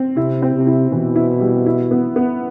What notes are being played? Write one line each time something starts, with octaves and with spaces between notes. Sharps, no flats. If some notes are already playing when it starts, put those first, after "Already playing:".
Already playing: C4
C3 E4
C4
C3
E4
B2 E3
E4
G3
E4
B3
B3